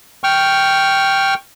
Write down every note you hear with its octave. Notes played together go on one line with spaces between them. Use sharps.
G5 C#6 F6